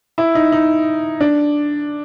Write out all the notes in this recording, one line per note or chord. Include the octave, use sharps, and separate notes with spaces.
E4
D#4
D#4
D4